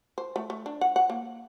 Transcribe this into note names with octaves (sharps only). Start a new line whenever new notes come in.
C5
A3
A3
D4
F#5
F#5
A#3